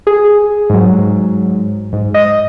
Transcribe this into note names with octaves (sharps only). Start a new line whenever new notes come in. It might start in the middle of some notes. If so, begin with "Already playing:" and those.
G#4
G#2 F#3
G#2
D#5